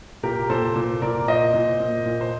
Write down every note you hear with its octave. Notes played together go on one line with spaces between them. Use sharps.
A#2 G4 A#4
A#2 A4 C5
A#2
A#2 A#4 D5
A#2 C5 D#5
A#2
A#2
A#2
C5